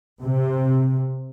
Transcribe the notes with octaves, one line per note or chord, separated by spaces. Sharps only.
C3